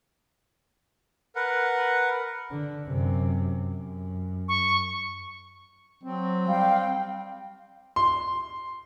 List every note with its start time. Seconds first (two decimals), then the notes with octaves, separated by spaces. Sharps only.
1.36 A#4 B4 F#5
2.51 D3
2.86 F#2 C3
3.74 F#2
4.48 C#6
6.03 F#3 C4
6.48 G3 F5 G5
7.96 C6